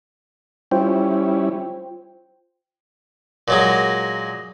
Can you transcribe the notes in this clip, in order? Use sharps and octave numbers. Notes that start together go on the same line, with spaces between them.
G3 C#4 E4 F4 C5 G5
A#2 F#3 G#3